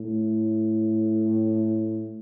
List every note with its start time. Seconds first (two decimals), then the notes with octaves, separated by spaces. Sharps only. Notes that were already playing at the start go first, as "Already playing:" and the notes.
Already playing: A2